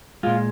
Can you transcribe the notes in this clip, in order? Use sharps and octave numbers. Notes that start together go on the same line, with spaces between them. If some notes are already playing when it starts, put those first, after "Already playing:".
A#2 G#3 F4